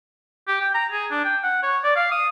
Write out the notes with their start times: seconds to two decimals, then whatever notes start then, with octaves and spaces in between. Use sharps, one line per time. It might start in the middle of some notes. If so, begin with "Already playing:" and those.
0.48 G4
0.61 G5
0.75 A#5
0.92 G#4
1.11 D4
1.25 G5
1.44 F#5
1.63 C#5
1.84 D5
1.96 F5
2.12 D#6